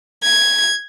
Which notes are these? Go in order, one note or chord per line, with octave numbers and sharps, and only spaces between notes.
G#6